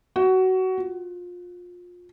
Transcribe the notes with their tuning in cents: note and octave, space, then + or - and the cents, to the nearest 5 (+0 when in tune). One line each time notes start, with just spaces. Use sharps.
F#4 +20
F4 +25